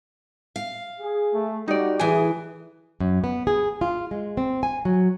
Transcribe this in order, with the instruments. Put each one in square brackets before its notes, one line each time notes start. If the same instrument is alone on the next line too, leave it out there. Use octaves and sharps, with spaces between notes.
[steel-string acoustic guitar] F5
[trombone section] G#4
[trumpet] A3
[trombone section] G3 F#4 [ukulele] D#4 D5 [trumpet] G4
[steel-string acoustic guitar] D2 E3 [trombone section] G#4 [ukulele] G#5
[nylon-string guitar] F#2
B3
G#4
F4
G#3
C4
G#5
F#3